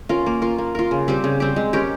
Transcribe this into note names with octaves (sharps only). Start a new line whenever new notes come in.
C#4 F4 A#4
A#3
F4 A#4
A#3
F4 A#4
C#3
G3 C4 G4
C#3
G3 C4 G4
G#3
C#4 G4 A#4